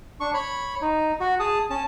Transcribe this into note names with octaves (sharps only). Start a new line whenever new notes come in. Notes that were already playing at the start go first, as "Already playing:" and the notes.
D4 C#6
C#5 B5
D#4
F#4
G#4 A5 D#6
C#4 A5